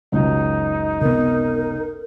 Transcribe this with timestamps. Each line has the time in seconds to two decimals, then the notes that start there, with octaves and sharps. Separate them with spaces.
0.12 F#1 C#2 F#2 D#4
1.01 C3 B3 A#4